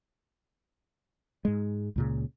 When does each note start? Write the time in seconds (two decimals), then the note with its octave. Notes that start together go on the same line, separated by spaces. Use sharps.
1.45 G#2 G#3
1.96 C#2 A#2 C#3